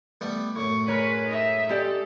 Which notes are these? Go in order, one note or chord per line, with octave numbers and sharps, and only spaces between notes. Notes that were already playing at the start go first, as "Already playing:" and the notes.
G3 A3 B3
F#2 A2 C#6
G#3 A#4 B4 C#5
D#4 E5
G#3 G4 A4 D5